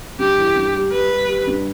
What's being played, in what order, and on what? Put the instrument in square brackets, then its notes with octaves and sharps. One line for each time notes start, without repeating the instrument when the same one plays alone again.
[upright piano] G2 [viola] G4
[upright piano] E3
G2
G3
[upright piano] G3 [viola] B4
[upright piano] G3
G3
G2